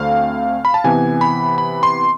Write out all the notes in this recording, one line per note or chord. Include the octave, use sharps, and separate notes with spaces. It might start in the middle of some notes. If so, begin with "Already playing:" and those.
Already playing: D2 D3 A3 C4 F5
B5
A5
C3 E3 B3 G#5
B5
B5
C6